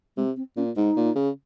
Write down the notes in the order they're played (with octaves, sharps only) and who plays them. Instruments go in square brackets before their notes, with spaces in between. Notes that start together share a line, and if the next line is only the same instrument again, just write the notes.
[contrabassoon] C3 [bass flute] G#3
[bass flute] C4
[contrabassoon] A#2 [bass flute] C#4
[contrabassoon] G#2 [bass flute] D#4
[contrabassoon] A#2
C#3